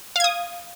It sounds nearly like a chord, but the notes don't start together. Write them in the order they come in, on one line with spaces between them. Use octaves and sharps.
F5 G#6 D#6